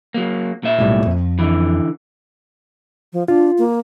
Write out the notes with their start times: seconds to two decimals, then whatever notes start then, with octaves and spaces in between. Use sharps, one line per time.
0.14 F#3 A#3
0.63 A#2 A#3 E5
0.78 B1 A2 G3
1.06 F2
1.39 D3 E3
3.13 F3
3.28 D4 F4
3.58 A#3